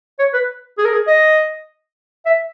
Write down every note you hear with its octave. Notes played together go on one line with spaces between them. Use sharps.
C#5
B4
G#4
A#4
G#4
D#5
E5